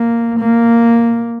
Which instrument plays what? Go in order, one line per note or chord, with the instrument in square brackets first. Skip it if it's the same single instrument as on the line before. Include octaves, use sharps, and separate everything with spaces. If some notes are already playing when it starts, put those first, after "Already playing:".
Already playing: [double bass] A#3
A#3